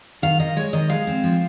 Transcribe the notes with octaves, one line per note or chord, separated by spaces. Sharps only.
D#3 F5
D#3 D#5
G#3 C#5
D#3 D#5
G#3 F5
C4
F3